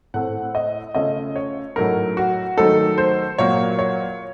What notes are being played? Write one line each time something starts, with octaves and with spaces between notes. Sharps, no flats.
A2 A3 C4 F#5
D#5
C#3 A3 C#4 F4 D#5
C#5
A2 F#3 A3 D#4 A#4
F#4
D#3 F#3 A3 D#4 A4
C5
A#2 F#3 A#3 C#5
C#5